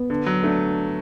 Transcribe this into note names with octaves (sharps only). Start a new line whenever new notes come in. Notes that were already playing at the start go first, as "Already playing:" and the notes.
Already playing: B3
D3
F#3
A3 D4